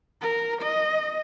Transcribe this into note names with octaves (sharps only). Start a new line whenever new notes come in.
A#4
D#5